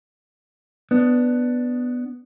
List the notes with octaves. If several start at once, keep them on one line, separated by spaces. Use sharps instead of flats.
B3 D4